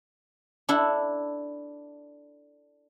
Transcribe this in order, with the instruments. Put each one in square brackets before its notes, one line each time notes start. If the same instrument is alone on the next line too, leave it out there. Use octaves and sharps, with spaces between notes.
[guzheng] D4 E4 A4